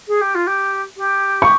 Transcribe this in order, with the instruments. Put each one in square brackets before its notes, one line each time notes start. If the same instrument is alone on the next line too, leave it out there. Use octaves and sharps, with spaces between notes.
[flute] G#4
G4
F4
G4
G4
[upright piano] C#6